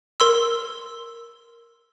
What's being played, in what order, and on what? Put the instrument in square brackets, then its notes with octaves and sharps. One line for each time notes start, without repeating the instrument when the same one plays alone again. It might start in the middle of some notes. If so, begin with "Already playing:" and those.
[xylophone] A#4 C6 E6